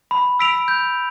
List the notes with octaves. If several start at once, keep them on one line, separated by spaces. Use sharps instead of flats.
B5
E6 B6 D7 F7
G6